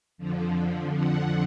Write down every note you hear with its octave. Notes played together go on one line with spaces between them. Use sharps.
F2 D3 F3
F#5